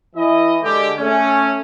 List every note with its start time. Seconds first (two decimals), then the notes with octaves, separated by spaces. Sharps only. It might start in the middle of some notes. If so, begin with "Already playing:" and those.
0.16 E3 E4 D#5
0.62 D3 G#3 G4
0.99 A3 C#4